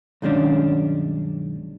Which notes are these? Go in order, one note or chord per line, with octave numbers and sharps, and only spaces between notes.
B1 G2 D#3 G#3 C#4 D4